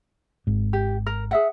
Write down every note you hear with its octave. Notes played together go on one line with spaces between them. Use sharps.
G#1 G#2
G4
A#4
G#4 E5 F#5